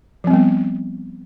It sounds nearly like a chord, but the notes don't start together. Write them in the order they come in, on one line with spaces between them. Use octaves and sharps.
F3 C4 G3 B3